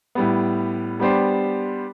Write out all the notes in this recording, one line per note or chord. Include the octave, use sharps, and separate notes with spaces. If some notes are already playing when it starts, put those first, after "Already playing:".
A2 G3 B3
G3 B3 D4 G4 C5